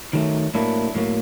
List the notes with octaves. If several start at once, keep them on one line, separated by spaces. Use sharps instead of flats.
D#3 F#3 A3
A2 F#3 A#3 D4 E4
A2 F#3 A#3